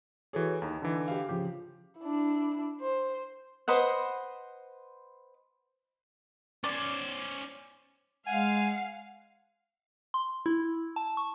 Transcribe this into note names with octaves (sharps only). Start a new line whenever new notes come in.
E3 F#4 G#4 A4 C#5
D#2 D#4 A#5
D3 E3
G4 F5
C#3 F3 G4
D4 E4
C5
B4 C5 D#5 F#5
C#4 C5 D5
G#3 F5 F#5 G#5
C6
E4
A5
C#6